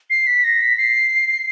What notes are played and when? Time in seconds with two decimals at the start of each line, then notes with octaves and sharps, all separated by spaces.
0.10 C7
0.27 B6
0.44 A#6
0.61 B6
0.78 C7